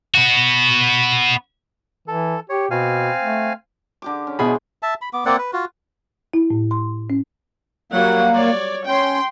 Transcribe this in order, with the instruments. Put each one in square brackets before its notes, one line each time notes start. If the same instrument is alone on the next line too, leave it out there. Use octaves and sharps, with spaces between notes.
[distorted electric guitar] B3 F#4
[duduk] E3 [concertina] A4
[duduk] G4 [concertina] C#5
[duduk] B2 [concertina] C4 F5 G#5
[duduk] A3
[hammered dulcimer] D3 G4 D6
C#4
[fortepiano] B2 G#4 B5 [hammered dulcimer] E3 G#3 C5
[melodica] E5 A5
B5
B3 D6
A#3 C4 D5 F#5
B4
F4 F#4
[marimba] E4
A2
C6
C#4
[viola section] F#3 G3 F#5 [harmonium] A#3
[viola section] C#5 D5
[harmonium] C#4 [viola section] G5 C6